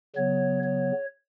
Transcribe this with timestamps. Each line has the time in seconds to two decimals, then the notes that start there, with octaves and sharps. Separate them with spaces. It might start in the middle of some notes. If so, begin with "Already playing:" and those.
0.16 C#3 F#3 B3 C#5
0.63 C#5